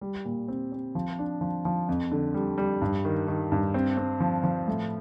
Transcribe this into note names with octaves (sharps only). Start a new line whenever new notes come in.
G3
A#2
C4
C4
F3
D4
F3
F3
F2
D3
G3
G3
G2
D#3
D#3
G2
C4
C4
F3
F3
A2